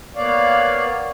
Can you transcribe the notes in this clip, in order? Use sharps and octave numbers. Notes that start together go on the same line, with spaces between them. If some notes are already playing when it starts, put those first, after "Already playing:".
A#3 B3 C#5 D5 F5